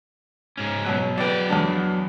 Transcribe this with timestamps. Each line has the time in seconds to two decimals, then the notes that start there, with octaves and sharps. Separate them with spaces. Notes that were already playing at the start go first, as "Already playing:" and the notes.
0.57 G#2 C#4
0.84 B2 F#3 F#6
1.18 F#3 B4 D5 G5
1.49 E2 B3 D4